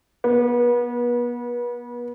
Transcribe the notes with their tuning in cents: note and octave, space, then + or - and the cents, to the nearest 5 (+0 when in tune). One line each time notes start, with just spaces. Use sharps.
B3 -30